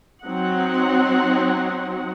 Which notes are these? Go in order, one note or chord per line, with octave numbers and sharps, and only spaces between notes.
F#3 C4 D#4 F#5